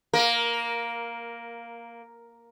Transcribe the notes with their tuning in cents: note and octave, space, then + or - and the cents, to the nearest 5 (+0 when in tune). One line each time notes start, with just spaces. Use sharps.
A#3 +0 A#4 +15